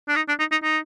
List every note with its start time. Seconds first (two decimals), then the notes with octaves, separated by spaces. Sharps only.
0.08 D4
0.16 D#4
0.28 D4
0.39 D#4
0.52 D#4
0.63 D#4